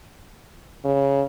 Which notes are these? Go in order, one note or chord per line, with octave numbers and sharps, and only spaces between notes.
C#3